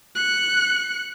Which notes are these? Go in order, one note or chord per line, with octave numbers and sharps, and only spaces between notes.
F#6 C#7